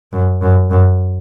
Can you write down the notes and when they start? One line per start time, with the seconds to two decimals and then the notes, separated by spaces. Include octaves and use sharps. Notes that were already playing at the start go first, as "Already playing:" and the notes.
0.13 F#2
0.42 F#2
0.71 F#2